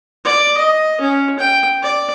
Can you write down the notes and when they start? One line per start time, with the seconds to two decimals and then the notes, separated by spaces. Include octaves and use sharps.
0.25 D5
0.58 D#5
1.01 C#4
1.39 G5
1.83 D5